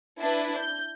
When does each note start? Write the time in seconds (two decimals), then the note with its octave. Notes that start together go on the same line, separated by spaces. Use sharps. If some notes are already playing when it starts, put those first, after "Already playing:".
0.19 D4 E4 B4
0.59 G6